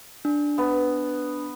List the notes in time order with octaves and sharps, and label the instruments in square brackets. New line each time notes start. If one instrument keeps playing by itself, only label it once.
[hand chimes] D4
[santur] B3